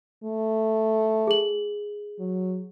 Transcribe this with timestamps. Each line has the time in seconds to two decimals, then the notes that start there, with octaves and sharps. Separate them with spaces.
0.24 A3
1.27 G#4 F#7
2.19 F#3